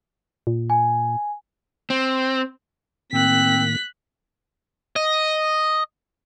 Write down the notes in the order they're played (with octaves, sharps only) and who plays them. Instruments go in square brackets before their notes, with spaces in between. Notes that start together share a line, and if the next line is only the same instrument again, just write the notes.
[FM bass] A#2
[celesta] G#5
[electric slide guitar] C4
[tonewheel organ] A2 D#3 A#3 [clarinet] C4 [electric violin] F#6 B6
[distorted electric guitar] D#5